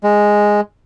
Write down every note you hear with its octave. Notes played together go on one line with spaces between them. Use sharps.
G#3